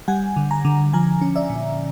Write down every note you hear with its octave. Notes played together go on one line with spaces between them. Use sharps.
G3 F#5 G#5
D3
G#5 A#5
D3
F3 G#5 A#5
C#4
D5 E5
A#2